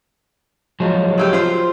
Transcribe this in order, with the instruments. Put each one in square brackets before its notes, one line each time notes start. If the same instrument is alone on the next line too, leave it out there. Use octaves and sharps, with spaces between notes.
[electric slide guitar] F3 F#3 G#3
[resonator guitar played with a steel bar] A2 A3 G4
F4 C5